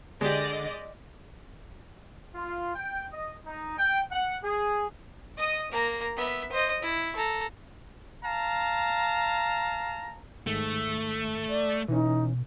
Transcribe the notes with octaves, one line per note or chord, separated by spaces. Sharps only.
D3 G#3 G4 D5 D#5
F4
G5
D#5
D#4
G5
F#5
G#4
D#5 D#6
A#3 A#5
B3 E5
C5 D#5
E4
A4 A#5
F5 A5 A#5
G#2 D#3 A3
D5
B2 E3 C#4 D#4